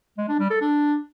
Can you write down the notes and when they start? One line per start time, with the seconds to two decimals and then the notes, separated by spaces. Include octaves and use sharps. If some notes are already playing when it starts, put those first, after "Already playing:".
0.18 G#3
0.29 D4
0.39 G3
0.50 A4
0.61 D4